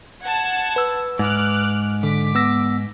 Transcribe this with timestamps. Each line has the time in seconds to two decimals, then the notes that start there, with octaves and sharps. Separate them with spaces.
0.24 F#5 A5 G#6
0.76 B4 E6
1.19 G#2 D6 F6 F#6
2.03 D3 D6 B6
2.35 B3 E6 A#6